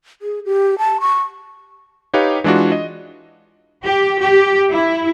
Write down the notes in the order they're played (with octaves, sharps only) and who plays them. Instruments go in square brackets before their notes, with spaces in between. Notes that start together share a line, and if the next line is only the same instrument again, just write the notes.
[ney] G#4
G4
A5
C#6
[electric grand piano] D#4 G4 B4 C#5 F5
E3 G#3 D4 F4 F#4
D#5
[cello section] G4
G4
E4